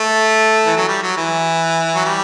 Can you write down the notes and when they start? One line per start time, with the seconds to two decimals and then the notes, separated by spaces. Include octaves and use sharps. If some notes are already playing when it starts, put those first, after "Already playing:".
Already playing: A3
0.66 E3
0.77 F#3
0.88 G3
1.03 F#3
1.17 E3
1.95 F#3
2.05 G3